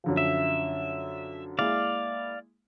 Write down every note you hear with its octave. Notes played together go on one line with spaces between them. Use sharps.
F#2 D3 F3
E5
G#3 A#3 E4 D5 F5